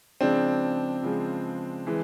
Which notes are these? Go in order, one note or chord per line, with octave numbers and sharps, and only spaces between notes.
C#3 F3 G#3 C4 D4
C#3 F3 G#3
E3 G#3